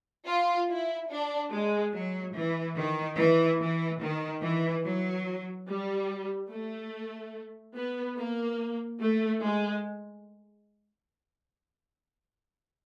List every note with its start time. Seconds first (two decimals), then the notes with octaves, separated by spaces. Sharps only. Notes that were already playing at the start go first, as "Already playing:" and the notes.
0.26 F4
0.69 E4
1.10 D4
1.52 G#3
1.94 F#3
2.35 E3
2.77 D#3
3.18 E3
3.60 E3
4.01 D#3
4.43 E3
4.84 F#3
5.67 G3
6.51 A3
7.76 B3
8.17 A#3
9.00 A3
9.42 G#3